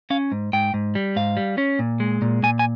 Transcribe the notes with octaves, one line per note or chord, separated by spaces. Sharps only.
C#4 F5
G#2
G#2 G5
G#2
G3
G#2 F5
G3
C#4
A#2
G#3
A#2
A#2 G#5
G#5